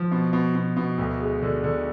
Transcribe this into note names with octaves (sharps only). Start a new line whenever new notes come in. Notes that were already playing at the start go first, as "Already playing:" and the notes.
Already playing: F3
B2
B2
B2
B2
D2
G#3
D3
D3